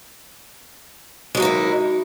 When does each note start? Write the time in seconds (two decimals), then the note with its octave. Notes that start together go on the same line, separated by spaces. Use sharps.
1.35 G#3
1.37 F#3
1.40 A#3
1.42 D#4
1.45 E4